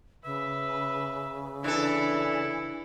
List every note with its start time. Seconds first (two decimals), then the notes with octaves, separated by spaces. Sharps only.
0.25 C#3 B4 E5
1.64 E3 D4 E4 A4